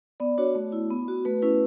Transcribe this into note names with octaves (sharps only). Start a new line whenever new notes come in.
B3 D5
D4 F#4 C#5
A3
E4
B3
F#4
A3 B4
C#4 E4 B4